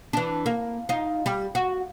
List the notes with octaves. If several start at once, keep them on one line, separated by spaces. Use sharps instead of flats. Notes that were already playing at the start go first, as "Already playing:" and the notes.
E3 D4
A#3
D#4 F4
G3
F#4